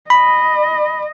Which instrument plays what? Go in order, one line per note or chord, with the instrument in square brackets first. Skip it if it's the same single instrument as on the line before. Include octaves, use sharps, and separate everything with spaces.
[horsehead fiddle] D#5 [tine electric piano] B5